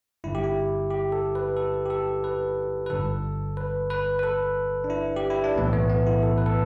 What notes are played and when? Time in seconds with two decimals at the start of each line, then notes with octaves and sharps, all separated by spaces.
0.24 G1 G2 D3 E4
0.35 G4
0.44 E4
0.91 G4
1.12 A4
1.35 B4
1.57 A4
1.86 G4
1.90 A4
2.24 B4
2.86 B4
2.90 G1 G2 D3 A4
3.57 B4
3.90 B4
4.19 B4
4.23 A4
4.84 D4
4.90 E4
5.16 G4
5.30 E4
5.44 D4
5.56 B1 A2 E3 B3
5.73 A3
5.89 B3
6.07 E4
6.23 A4
6.38 B4
6.46 A4